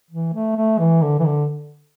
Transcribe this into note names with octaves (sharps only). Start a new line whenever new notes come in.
E3
A3
A3
E3
D3
E3
D3